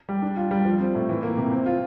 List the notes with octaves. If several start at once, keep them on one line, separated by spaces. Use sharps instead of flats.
G3
D4
F4
G3
F3
C4
A2
E3
A#3
C3
C4
F4